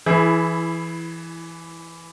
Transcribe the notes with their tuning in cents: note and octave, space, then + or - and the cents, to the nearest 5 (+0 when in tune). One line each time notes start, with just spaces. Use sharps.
E3 +15 E4 +0 G#4 +35